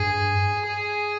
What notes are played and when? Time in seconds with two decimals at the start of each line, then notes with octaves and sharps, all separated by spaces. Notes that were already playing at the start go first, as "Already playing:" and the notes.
Already playing: G2 G#4
0.67 G#4